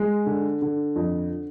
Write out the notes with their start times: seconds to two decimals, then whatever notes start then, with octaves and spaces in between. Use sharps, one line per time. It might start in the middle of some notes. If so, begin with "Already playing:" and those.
Already playing: G#3
0.26 D3
0.62 D3
0.96 F2